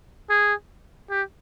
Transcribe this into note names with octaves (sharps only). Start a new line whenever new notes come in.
G#4
G4